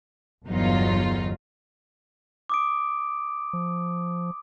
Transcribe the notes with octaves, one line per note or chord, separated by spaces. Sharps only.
G1 E2 F#3 D#4 F4
D6 D#6 D7
F3